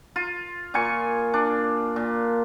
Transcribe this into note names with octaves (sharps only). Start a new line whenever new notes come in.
F4
A#2 F4 G#5 C#6
D4
A#2